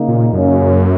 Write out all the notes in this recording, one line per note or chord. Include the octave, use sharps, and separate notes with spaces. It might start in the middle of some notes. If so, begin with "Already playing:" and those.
Already playing: C#3 A#3 D#4
A#2
F#2 C#3 A#3 C#4